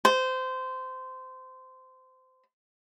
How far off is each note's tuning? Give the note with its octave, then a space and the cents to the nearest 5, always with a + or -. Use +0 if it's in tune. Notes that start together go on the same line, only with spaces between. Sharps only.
C5 -20